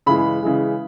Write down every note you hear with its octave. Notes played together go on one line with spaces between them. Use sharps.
C#3 E3 G#3 B5
C#3 E3 G#3